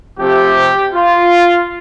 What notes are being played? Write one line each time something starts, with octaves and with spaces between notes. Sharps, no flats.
C3 F3 A3 G4
F4